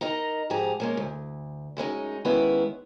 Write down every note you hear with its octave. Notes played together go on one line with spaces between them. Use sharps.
D#4 A#4 D#5 A#5
G#2 F3 G4 G#4 A#5
G#3 A#3 C#4
D2
F#2 G#3 C#4 D#4
D#3 G#3 B3 C#4 E4 B4